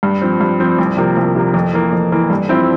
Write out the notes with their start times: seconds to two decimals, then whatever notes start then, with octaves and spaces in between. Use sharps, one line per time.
0.03 G2
0.21 F3 C4
0.40 G2
0.60 F3 C4
0.79 C2
0.97 C3 F3 A#3
1.16 C2
1.35 C3 F3 A#3
1.54 F2
1.73 E3 A#3
1.92 F2
2.12 E3 A#3
2.30 G2
2.49 F3 C4 E4